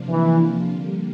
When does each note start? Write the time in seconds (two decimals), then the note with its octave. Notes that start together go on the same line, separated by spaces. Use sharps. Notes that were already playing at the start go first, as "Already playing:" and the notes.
Already playing: C3 F3 A#3 D4 F4
0.09 E3
0.72 D3 G3 A#3